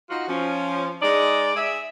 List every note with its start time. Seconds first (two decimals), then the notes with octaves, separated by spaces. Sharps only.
0.10 D#4 F4 F#4
0.28 F3 C#4
1.02 G#3 D#4 D5
1.56 G#4 E5